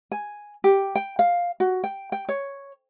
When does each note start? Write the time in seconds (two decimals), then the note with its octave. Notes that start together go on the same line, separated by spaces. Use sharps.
0.12 G#5
0.64 G4
0.95 G5
1.19 F5
1.60 F#4
1.84 G5
2.12 G5
2.29 C#5